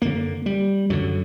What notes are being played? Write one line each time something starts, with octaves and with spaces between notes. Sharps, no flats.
F#2 D3 A#3
G3
F#2 D3 F#3